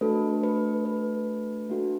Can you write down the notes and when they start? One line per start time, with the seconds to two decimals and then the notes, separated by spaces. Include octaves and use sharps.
0.01 A3 D4 F#4 A4 B4
0.43 B4
0.85 B4
1.70 A#3 D4 F#4 A4